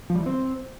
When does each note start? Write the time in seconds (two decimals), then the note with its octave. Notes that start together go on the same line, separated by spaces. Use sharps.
0.10 F3
0.15 G3
0.21 E3
0.26 C4